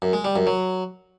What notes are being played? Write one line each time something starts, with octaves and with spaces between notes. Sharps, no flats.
F#2
G#3
G3
F#2
F#3